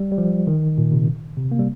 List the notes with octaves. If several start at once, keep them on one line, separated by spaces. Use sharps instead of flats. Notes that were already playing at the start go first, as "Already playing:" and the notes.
Already playing: G3
G3
F3
D#3
A#2
C3
C3
A#3
G3